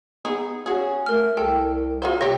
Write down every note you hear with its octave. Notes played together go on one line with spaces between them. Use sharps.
B3 D#4 G#4
C#4 F#4 G#4
A3 A#4 F6
C2 A4 G5
F4 F#4 C5
C3 G4 C#5 G5 A#6